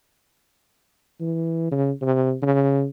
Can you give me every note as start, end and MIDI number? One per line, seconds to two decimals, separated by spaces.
1.20 1.68 52
1.71 1.91 49
2.02 2.35 48
2.42 2.86 49